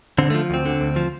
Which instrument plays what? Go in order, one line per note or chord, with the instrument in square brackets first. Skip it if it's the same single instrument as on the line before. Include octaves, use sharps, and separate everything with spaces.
[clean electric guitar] D3 C4
F3 A3
D2 C4
D3
D2
F3